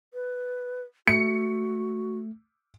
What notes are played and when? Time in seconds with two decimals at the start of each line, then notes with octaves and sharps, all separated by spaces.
0.14 B4
1.08 A3 F#4 C#7